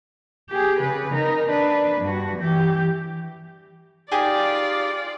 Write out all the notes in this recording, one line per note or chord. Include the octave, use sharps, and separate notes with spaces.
G4 G#4
C#3 B4
D#4 A#4
D4 B4
G2 F#4
E3 G4
D#4 F4 G4 G#4 D5